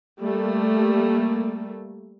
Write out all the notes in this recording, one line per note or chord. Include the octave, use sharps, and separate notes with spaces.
G3 A3 A#3